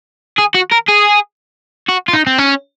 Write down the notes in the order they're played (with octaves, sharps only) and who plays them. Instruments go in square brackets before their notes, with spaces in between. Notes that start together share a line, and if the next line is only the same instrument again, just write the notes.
[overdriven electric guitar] G#4
F#4
A#4
G#4
F#4
F4
D#4
C4
C#4